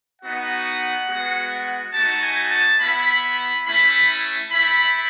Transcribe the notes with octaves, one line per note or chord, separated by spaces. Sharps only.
B3 D#4 F#4 F#5
G#3 B3 F#4
A3 D#4 F#4 A5
G#5
A5
B3 E4 B5
A3 C#4 E4 B5
A3 E4 B5